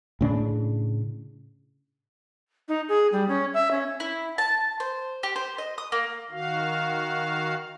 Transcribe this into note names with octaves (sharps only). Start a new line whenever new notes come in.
A2 C#3 D4
D#4
G#4
G3
C#4
E5
C#4
E4
A5
C5
G4
C5
D#5
D#6
A#3
D#3 F#4 F5